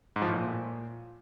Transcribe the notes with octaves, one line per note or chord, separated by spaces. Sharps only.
G#2
F3
A2
A#2